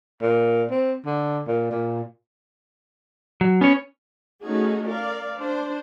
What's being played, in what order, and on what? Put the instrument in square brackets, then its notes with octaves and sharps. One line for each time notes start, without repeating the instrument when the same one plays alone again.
[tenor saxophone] A#2
C4
D3
A#2
A#2
[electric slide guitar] F#3
[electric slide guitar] B3 C#5 [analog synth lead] C#4
[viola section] A3 C#4 D#4 F#4 G#4
A#4 D5 F5
D4 C5